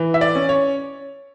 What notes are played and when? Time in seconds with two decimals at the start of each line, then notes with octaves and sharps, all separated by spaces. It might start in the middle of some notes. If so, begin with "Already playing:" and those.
Already playing: E3
0.14 E5
0.21 D5
0.35 C#4
0.49 C#5